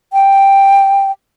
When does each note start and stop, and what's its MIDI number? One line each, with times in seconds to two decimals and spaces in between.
0.13 1.11 79